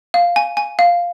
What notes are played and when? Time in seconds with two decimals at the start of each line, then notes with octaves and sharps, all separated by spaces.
0.14 F5
0.36 G#5
0.57 G#5
0.79 F5